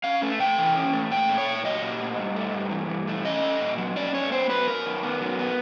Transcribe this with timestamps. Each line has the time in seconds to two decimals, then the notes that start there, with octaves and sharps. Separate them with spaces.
0.04 C#4 F5
0.22 A3
0.39 C3 G5
0.58 E3
0.75 C#4
0.93 A3
1.11 A#2 G5
1.29 A3
1.38 C#5
1.47 A#2
1.64 F#3 D#5
1.82 A#2
2.00 A3
2.19 G2
2.36 A3
2.54 G2
2.71 E3
2.90 G2
3.08 A3
3.25 C#4 D#5
3.43 A3
3.61 A#2
3.78 F#3
3.96 C#4 D5
4.13 A3 C#5
4.31 B3 C5
4.50 F#3 B4
4.67 F#2 A#4
4.85 D#3
5.03 B3
5.21 F#3
5.39 B3